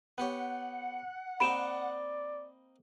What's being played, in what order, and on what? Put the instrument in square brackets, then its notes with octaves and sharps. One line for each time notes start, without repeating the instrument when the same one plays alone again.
[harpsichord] B3 G4 C#5 [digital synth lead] F#5
[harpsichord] A#3 C4 D#4 [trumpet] D5 [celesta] B5 D7 E7